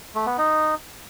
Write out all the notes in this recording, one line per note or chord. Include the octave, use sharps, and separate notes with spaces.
A3
B3
D#4